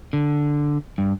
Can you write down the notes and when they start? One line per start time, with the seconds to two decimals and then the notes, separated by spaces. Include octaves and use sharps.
0.13 D3
0.98 G2